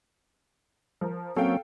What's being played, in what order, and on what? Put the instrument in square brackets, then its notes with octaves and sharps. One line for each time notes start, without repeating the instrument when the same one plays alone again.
[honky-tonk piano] F3 A#4
[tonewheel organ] F#3 A#3 C#4 [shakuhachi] C4 [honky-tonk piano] A4 F5 G5